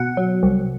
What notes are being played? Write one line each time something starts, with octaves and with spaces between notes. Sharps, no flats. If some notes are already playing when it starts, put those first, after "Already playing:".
Already playing: B2 F#5
F#3
C2